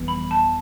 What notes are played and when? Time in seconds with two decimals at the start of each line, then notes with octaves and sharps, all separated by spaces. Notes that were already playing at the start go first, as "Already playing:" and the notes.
Already playing: G1 F2 E3 G3 B3
0.08 B5
0.31 A5